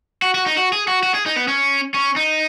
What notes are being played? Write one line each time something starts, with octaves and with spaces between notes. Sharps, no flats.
F#4
F#4
D#4
F#4
G#4
F#4
F#4
G#4
D#4
B3
C#4
C#4
D#4